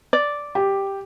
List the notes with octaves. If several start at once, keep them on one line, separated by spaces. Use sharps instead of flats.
D5
G4